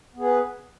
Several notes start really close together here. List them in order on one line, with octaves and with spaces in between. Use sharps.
B3 G#4 B4